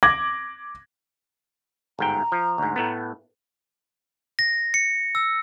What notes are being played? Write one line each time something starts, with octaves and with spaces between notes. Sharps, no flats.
D6 G#6 A#6 F#7
G1 G#2 G5 A#5
F3
D2 G#2
A2 A3 B3
A#6
C#7
E6